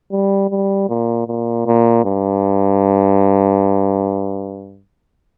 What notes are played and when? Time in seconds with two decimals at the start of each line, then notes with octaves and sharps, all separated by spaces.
0.12 G3
0.50 G3
0.89 A#2
1.28 A#2
1.66 A#2
2.05 G2